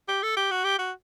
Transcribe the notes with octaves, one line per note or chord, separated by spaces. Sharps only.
G4
A4
G4
F#4
G4
F#4